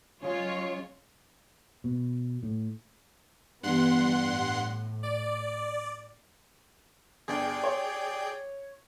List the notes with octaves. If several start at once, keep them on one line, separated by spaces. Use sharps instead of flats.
F#3 G#3 C#4 F4 C#5
B2
A2
G2 E3 B3 F#5 C6
A2
D5
G1 G#4 D5 G5
C#5